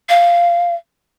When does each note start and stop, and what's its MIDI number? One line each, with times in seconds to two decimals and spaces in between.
0.09 0.75 77